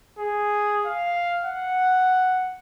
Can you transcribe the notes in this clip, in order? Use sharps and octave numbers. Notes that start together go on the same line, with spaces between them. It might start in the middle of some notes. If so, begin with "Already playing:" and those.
G#4
F5
F#5